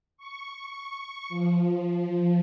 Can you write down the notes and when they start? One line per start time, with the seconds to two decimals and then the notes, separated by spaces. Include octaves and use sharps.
0.17 C#6
1.29 F3